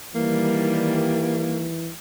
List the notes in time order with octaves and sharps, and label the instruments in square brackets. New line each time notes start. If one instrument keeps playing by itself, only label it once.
[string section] D#3 G3 [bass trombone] E3 [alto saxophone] A#3